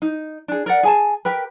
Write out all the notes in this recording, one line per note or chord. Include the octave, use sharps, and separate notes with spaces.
D#4
D4 G#4
A#4 D5 F#5
G#4 G#5 A5
G4 A#4 B4